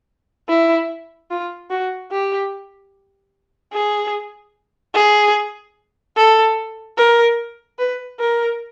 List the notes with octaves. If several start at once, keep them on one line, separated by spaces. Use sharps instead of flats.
E4
F4
F#4
G4
G#4
G#4
A4
A#4
B4
A#4